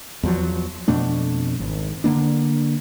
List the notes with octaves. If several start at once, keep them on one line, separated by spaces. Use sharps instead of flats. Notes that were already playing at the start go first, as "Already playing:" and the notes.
E2 F3 F#3
F2 B2 A3 D4
G#1
D3 E3 A#3 D4